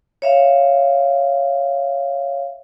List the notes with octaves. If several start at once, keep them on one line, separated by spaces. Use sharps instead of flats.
C#5 E5 F5